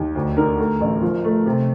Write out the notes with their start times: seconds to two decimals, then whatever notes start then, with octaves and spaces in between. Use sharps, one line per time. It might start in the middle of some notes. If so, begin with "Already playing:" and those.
Already playing: D#2
0.15 D2
0.37 D3 A#4
0.59 A3
0.81 A1
1.02 F3
1.24 A3
1.46 C3